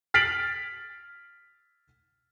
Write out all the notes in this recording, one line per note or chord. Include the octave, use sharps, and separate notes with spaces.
F6 A6 B6 C7 D7 F#7